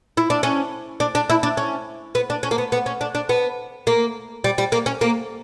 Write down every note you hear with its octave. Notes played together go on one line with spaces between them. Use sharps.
E4
D4
C#4
D4
D4
E4
D4
C#4
B3
D4
C#4
A#3
B3
B3
C#4
D4
D4
B3
A#3
G3
G3
A#3
C#4
A#3